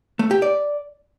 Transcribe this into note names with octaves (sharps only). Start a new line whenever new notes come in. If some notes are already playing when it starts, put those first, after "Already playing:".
A3
G4
D5